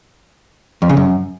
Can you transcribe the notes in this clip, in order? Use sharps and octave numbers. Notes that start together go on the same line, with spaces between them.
F2
C#3
F#2